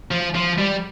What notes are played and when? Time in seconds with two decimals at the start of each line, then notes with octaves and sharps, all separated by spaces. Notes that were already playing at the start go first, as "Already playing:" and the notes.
0.11 F3
0.35 F3
0.58 G3